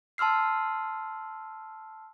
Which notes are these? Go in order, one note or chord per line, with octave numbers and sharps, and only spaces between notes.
A5 C6 E6 F6 C7